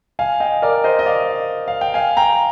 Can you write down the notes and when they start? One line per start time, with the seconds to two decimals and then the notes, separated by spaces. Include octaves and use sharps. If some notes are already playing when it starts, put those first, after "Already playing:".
0.19 F5 G#5
0.40 D#5 G5
0.62 A#4 D5
0.84 C5 D#5
0.99 D#5
1.06 D5 F5
1.68 F5
1.81 G5
1.94 F5 G#5
2.17 G5 A#5